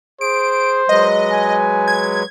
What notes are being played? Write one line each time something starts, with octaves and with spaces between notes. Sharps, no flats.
G#4 C5 D7
F#3 G#3 B4 D#5
G#5
G#6